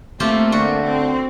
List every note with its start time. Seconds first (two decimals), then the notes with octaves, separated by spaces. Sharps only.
0.20 A3 A#3 C4 F4 G4
0.52 D3 F#4
0.82 C4